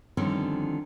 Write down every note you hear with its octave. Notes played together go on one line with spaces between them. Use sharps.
D3 D#3 F3 G3 C4 C#4